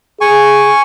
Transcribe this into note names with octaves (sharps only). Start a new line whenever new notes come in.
G#4 G#5 C#6